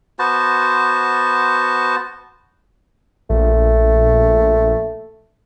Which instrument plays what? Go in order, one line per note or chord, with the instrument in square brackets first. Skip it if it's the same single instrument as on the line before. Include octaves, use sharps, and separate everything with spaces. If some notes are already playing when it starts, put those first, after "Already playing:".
[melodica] B3 F#4 C5 A5
[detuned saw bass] A#1 [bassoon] A3